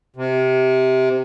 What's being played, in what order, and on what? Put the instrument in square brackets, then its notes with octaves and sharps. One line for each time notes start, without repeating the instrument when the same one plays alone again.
[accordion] C3